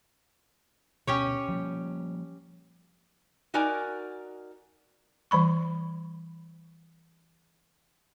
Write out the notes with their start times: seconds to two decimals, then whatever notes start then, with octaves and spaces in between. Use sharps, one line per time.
1.07 D2 B2 C#4 G4 C#5
1.48 F3 G3 A#3
3.54 D#4 F#4 A#4 D5 G#5 A#5
5.31 E3 G3 B5 C#6